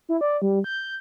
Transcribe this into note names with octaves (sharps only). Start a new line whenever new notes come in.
E4
D5
G3
G6